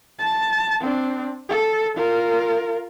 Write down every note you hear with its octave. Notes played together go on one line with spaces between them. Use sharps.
A5
C4 D4
A4
F4 A#4